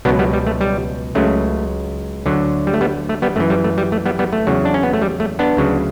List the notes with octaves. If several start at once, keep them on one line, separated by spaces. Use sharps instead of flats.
C#2 B2 F#3 B3 D4
G3 B3
G3
A3
G3
C#2 C#3 F#3 A3
D2 D3 F#3
G3
A3
G3 B3
A3
G3 B3
F#2 E3 A3
G3
A3
G3
A3
G3 B3
G3 B3
A3
E2 C#3 F#3
D4
C#4
B3
A3
G3
A3
B3 D4
D2 C#3 F#3